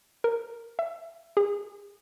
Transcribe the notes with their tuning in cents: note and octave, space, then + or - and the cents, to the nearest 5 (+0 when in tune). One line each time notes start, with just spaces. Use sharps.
A#4 -5
E5 +20
G#4 -40